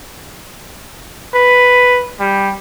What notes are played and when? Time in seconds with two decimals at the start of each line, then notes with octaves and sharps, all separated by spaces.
1.34 B4
2.20 G3